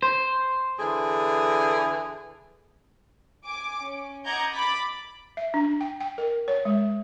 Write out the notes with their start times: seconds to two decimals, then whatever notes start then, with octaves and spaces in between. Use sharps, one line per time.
0.02 C5
0.79 D3 E3 G#4
3.44 G#5 D6
3.81 C#4
4.25 D#5 F#5 A#5 D6 G6 G#6
4.55 B5 D6 A6 B6
5.37 E5
5.54 D4
5.81 G5
6.00 G5
6.18 A#4
6.48 C#5
6.65 G#3